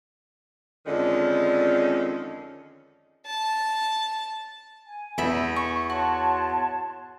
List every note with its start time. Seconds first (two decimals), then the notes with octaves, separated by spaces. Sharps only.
0.86 F2 D3 D#3 G#3 C#4
3.26 A5
4.86 G#5
5.18 E2 E5 B5
5.56 C#6
5.90 F#4 C#5 A5 C6